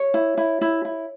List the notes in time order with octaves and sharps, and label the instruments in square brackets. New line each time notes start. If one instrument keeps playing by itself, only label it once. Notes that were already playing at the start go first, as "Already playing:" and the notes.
Already playing: [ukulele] C#5
E4
E4
E4
E4